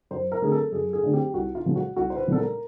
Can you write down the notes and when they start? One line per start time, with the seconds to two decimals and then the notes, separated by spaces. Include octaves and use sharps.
0.11 F#2 C5
0.32 A#4
0.42 D3 F#3 A3 C4 G#4
0.52 A4
0.72 F#2 G#4
0.93 G#4
1.03 D3 F#3 A3 C4
1.14 G4
1.34 C2 F#4
1.55 F4
1.65 A#2 F3 G#3 B3
1.76 F#4
1.96 C2 F#4
2.10 C5
2.16 B4
2.28 A#2 F3 G#3 B3 A4
2.38 A#4